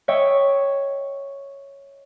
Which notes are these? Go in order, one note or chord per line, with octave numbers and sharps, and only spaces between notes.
C#5 D#5 E5 G5